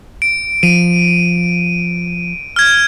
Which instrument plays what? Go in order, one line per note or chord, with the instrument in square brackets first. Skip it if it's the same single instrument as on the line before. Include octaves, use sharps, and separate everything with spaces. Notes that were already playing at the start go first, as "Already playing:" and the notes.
[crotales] D7
[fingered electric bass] F3 [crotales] D#7
[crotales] F6 G#6